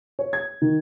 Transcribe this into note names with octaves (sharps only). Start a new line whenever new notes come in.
C#5
G#6
D#3